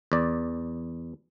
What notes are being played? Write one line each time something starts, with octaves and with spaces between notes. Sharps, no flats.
E2 D5